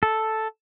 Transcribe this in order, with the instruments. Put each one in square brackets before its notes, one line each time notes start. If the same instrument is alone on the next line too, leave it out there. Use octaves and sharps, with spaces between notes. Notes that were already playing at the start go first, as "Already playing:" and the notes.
[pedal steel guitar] A4